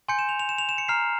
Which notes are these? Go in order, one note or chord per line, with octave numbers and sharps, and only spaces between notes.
G#5 C6 G6 C#7
E7
F7
F7
E7
F7
E7
C#7
A#5 F6 C7